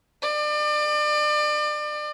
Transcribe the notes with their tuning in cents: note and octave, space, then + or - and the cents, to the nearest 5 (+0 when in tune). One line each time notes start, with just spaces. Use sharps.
D5 +35